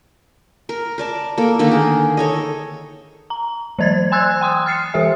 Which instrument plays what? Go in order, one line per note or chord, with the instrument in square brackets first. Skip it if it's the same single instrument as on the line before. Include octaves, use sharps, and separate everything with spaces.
[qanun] A#4
A#4 D5 A5
A#3 A4
D3 D#3 A3 A#3
G#4
A4 C#5 D#5
[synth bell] A#5
E3 F#3 C5 G#6 A6
G#5 C6 E6 F#6 G#6 A6
G5 C6 D#6
F6 A6 C7 C#7
E3 G4 A4 E5